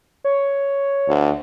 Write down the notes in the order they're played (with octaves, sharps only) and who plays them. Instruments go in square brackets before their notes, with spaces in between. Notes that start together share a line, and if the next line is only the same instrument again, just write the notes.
[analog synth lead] C#5
[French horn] D2